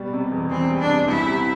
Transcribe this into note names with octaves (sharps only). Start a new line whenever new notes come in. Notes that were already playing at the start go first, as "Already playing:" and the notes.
Already playing: B2 G3
C3
E2
E3 C4
G3
D4
C3
C2 E4
C3